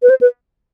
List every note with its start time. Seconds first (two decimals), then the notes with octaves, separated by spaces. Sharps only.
0.02 B4
0.10 C5
0.21 B4